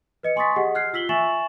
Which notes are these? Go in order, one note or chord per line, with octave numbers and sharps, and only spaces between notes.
B4 D#5 C#7
G#5 C6 C#6 D#6 A6 B6
G4 G#4 D#5 F#5
F6 F#6 G#6 C7
F4 E6 B6 F#7 G7
E5 G#5 C#6 A6 E7 F#7